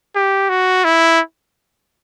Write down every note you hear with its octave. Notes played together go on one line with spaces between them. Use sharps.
G4
F#4
E4